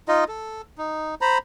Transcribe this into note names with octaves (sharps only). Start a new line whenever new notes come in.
D#4 F4 D#5
A4
D#4
C5 A#5 B5